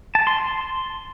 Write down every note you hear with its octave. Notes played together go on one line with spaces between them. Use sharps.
A5
C6
C6